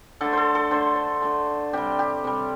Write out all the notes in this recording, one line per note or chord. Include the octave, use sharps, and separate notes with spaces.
D3 A3 A4
A4 C5
A4
D3 A3 C5
C5
D3 A3 A4
C3 G3 G4
G4
C3 G3